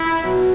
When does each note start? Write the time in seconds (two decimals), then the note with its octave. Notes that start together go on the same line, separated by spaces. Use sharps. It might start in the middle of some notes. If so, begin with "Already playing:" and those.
Already playing: E4
0.23 B2 F#3